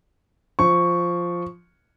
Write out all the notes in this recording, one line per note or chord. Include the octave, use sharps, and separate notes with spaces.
F3 C#6